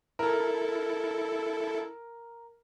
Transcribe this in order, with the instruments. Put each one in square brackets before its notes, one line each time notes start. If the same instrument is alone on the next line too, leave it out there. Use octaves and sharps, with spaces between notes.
[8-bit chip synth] E4 A4 [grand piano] A#4